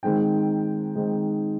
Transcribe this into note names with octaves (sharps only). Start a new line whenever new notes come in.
D#3 G#3 C4 D#4 G5
D#3 G#3 C4 D#4